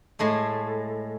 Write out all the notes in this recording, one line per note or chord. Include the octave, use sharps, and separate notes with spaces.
A2 G#3 A3